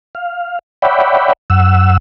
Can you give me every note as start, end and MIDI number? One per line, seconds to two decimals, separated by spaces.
0.15 0.59 77
0.82 1.33 73
0.82 1.33 74
0.82 1.33 76
0.82 1.33 78
0.82 1.33 79
0.82 1.33 83
1.50 1.97 42
1.50 1.97 78
1.50 1.97 88